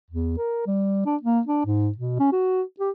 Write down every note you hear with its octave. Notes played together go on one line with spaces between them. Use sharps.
E2
A#4
G3
D4
A#3
D4
G#2
B2
C#4
F#4
G4